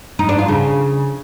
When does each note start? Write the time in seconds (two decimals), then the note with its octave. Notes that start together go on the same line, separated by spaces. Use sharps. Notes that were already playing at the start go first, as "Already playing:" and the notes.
0.19 D#4
0.29 D4
0.39 F4
0.48 C#3